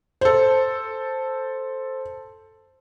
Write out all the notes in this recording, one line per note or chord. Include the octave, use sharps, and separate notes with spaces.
A4 C5